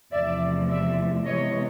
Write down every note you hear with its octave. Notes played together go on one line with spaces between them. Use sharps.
E2 C3 F3 A3 D5 E5
D5 E5
C3 E3 G#3 B3 C#5 D#5